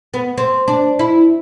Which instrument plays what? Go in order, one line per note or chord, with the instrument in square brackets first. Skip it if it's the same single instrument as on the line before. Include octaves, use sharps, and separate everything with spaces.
[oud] B3
C4
D4
E4